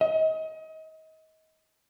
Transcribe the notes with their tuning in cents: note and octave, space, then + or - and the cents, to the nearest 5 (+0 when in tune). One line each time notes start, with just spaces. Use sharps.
D#5 +30